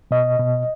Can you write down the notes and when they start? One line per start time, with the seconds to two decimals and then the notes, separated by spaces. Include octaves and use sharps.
0.11 B2 D#5
0.39 B2